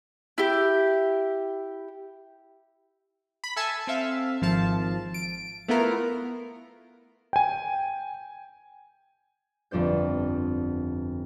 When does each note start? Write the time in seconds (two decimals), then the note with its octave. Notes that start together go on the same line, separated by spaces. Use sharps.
0.38 E4 G4
3.44 B5
3.56 A4 E5 G#5 A5 E6
3.87 C4 A4 E5 F5
4.42 G#1 F3 F5 A5
5.14 D7
5.68 A3 B3 E4 F4 A#4
7.33 G5 G#5
9.71 G1 F2 D4 C5 G6